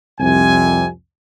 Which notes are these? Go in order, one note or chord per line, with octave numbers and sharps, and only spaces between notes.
C2 F2 C3 G#5